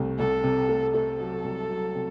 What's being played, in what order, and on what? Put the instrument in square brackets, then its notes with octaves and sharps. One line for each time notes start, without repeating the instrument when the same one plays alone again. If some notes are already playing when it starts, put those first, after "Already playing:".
Already playing: [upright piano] C2 C3 A3
[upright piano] C2 [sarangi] A4
[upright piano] C3
A3
[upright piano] A3 [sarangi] A4
[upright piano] F#3
C2
F#3
C3